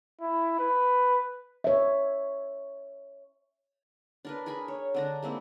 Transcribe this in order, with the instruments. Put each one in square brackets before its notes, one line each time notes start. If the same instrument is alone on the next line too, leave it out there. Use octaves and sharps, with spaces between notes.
[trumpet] E4
B4
[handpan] C#5 E5
[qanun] D4 A#4 B4
G#4 A#4 G#5 B5
C#5
D3 D4 A#5
G#3 A#3 C4 E4